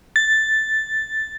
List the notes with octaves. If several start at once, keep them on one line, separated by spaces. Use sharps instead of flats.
A6